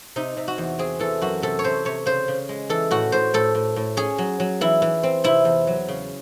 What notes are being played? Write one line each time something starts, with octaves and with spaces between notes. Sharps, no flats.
C3 D#4
C3
F#4
E2
C4 G#4
E3 A4
F#2 F#4
C3 A4
C#5
C3 C5
C3 C#5
C#3 C5
C#3
G#3
E3 A4
A2 F#4
A2 C5
A2 A4
A2
A2
C#4 G#4
F#3
F#3
E3 E4
E3
C4
C3 E4
E2
F#3
C#3